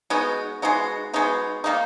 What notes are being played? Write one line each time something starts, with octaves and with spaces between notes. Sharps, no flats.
G#3 B3 D#4 F#4
G#3 B3 D#4 F#4
G#3 B3 D#4 F#4
D#3 A#3 D#4